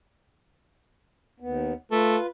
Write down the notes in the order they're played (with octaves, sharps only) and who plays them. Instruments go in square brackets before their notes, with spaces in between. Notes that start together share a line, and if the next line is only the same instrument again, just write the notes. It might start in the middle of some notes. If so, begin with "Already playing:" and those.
[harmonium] D#2 B3
[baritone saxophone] A3 [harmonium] F4 B4